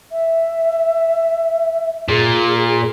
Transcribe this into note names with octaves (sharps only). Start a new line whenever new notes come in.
E5
A#2 G#4